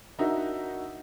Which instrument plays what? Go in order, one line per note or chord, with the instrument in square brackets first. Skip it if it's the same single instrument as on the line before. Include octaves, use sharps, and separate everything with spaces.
[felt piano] D4 D#4 F#4 A#4 E5 F#5